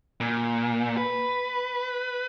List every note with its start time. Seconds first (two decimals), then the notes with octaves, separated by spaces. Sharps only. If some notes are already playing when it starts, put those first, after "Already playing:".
0.21 A#2
0.97 B4